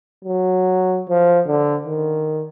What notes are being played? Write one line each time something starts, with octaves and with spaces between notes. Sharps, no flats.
F#3
F3
D3
D#3